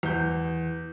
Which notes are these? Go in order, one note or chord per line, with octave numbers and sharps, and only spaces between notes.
E2 G6